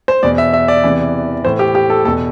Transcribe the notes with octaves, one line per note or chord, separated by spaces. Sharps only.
C5
E2 B2 D5
E5
E5
D5
E2 C3 E3
A2 E3 C5
G4
G4
A4
E2 B2 A4